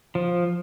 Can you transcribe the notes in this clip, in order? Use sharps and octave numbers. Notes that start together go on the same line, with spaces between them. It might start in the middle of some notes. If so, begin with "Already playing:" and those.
F3